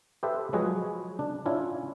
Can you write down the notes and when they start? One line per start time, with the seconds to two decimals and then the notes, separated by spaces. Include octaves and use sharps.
0.23 G4 A4 B4 C5 E5
0.53 F3 F#3 G#3 F#4 G#4 B4
1.19 D4
1.46 C#4 D4 E4 F4 C#5